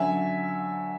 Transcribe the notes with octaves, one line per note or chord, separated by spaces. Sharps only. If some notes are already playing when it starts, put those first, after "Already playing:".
Already playing: D3 F#3 C#4 E5 G#5